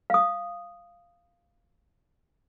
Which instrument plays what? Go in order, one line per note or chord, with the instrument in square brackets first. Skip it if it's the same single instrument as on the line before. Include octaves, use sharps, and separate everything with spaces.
[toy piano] F5 D#6